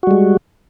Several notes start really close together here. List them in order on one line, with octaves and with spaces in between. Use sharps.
F#4 G3 G#3